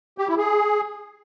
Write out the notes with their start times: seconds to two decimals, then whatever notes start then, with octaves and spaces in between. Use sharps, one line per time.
0.18 G4
0.28 E4
0.37 G#4